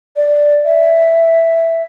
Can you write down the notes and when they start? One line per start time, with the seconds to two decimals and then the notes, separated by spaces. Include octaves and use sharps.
0.16 D5
0.65 E5